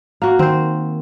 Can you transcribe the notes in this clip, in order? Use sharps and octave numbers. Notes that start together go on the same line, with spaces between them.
A#3 F#4
D#3 C4 C5